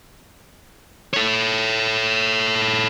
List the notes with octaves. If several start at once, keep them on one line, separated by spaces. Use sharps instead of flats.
A4 C#5